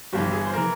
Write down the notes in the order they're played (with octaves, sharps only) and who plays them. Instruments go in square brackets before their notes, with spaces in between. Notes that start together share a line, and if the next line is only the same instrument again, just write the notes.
[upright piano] G1 G2 E3 G4
G#4
C5
E3 A#4